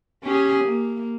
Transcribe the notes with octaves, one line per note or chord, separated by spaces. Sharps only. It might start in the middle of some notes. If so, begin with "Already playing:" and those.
C#4 G4 G#4
A#3